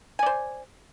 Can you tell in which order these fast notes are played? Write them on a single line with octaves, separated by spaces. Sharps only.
G#5 D5 C5